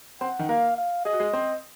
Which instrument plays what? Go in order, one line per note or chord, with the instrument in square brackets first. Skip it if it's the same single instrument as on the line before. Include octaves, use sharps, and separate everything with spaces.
[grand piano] C4 C5 [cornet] F#5
[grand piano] D#3 D#4
[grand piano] A#3 A#4 [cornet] F5
[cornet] F5
[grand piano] G#4 [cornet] D#5
[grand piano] F#4
G#3 G#4
C4 C5